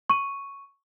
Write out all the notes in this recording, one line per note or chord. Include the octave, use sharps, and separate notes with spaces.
C#6 D#7